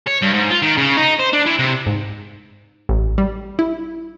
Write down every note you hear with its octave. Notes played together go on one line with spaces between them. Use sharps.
C#5
G2
G#2
F4
D#3
C#3
D#4
C5
D4
E3
C3
G#2
A1
G3
E4